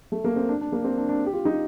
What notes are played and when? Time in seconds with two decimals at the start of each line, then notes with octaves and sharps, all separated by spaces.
0.12 A3
0.24 A#3
0.36 C4
0.49 D4
0.61 D4
0.72 A#3
0.84 C4
0.97 D4
1.09 D4
1.26 G4
1.33 F4
1.45 D#4